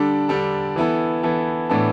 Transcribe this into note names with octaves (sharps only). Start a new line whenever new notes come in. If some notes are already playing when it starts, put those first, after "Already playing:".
Already playing: D3 G3 D4 A4
D3 G3 D4 A4
E3 B3 E4 A4
E3 B3 E4 A4
A2 E3 B3 D4 A4